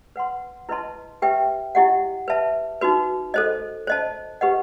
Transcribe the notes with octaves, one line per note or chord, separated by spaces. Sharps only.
B4 F#5 C6
E4 B4 D#5 A5 C6
G4 B4 E5 G5
E4 G4 D#5 F#5
B4 E5 A5
D#4 F#4 B4
A4 C5 D#5
C5 D#5 A5
G4 B4 D#5 F#5